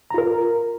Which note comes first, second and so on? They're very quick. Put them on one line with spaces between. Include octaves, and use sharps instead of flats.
A#5 F4 A#4